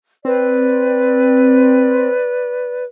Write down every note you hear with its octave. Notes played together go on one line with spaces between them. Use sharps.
C4 B4 D5